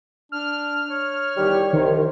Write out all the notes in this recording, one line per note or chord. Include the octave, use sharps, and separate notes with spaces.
D4 F6
C#5
E2 D#3 G3 G4
C2 D#3 C5